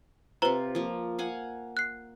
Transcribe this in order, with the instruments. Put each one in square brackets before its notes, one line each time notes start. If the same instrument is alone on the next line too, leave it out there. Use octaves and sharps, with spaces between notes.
[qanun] C3 F4 [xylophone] B4 C5 A#5
[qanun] F3 A#3
F5 F#5 G#5
[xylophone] F#6 C7